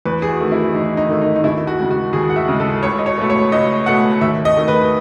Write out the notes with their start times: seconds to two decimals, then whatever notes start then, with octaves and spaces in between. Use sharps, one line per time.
0.05 E2 B4
0.22 G#4
0.28 F#4
0.40 D#3 A3
0.52 E4
0.74 E2 D#4
0.97 D#4
1.09 D#3 A3
1.21 D#4
1.36 D#4
1.44 D#2 E4
1.67 F#4
1.78 C#3 G#3
1.91 F#4
2.13 D#2 G#4
2.30 F#5
2.36 E5
2.48 C#3 G#3
2.60 A4
2.83 C#2 C#5
2.98 D#5
3.06 C#5
3.18 B2 A3
3.30 C#5
3.52 C#2 D#5
3.86 B2 A3 F#5
4.21 D#2 E5
4.45 D#5
4.56 D#3 A3
4.68 B4